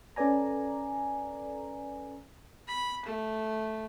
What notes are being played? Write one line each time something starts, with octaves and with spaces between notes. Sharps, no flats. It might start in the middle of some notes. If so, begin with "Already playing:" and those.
C#4 A4 B4 D5 G#5 A#5
B5
A3